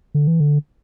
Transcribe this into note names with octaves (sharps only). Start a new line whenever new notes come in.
D3
E3
D3